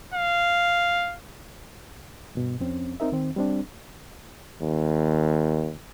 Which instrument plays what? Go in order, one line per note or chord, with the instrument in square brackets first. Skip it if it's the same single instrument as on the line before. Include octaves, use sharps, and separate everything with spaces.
[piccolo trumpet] F5
[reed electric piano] G2 B2
F2 C4 C#4
C4 D#4 A#4 E5
D#3 C4
G3 C4 D4
[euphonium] D#2